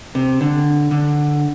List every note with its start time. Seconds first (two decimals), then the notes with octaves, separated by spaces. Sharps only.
0.15 C3
0.41 D3
0.91 D3